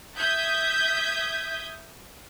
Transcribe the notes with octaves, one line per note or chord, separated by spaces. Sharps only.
E5 D#6 G6 G#6 B6